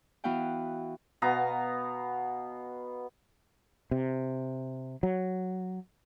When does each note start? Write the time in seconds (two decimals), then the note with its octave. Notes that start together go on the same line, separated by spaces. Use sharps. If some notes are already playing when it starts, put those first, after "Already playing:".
0.24 E3 B3 E4 F#4 F5 G5
1.22 B2 B3 F5 A#5
3.91 C3
5.03 F#3